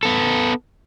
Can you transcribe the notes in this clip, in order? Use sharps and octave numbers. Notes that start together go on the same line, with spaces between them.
B3 A4